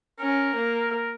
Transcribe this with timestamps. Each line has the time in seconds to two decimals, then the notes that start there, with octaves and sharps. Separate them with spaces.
0.19 C#4 A#4
0.55 A#3
0.91 A#4